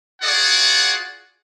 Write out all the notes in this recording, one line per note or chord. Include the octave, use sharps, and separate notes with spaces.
F4 F#4 G#4 D5 F#5